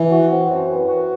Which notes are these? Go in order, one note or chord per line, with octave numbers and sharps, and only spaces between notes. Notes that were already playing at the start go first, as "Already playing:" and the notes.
Already playing: E3
F#4
C4
F#2
E3
F#4